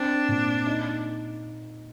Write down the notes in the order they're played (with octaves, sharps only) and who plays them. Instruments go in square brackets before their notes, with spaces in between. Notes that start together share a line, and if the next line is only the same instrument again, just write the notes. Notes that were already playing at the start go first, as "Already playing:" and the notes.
Already playing: [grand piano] C4 [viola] D4
[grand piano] A#2
D#4